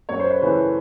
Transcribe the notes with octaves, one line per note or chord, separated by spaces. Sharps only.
F#2 C#5
C5
B4 C#5
C#3 E3 A3 B4